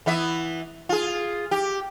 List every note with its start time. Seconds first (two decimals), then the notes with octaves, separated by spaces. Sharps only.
0.06 E3 B3 E5
0.89 F4 G#4
1.51 G4